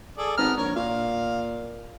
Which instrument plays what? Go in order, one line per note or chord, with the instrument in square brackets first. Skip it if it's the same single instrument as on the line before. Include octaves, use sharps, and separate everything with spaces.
[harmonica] G#4 A4 D5
[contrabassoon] G#1 [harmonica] B3 A#5 F6
[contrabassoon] A#1 [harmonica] A#4 C#5
[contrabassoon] A#2 [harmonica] F5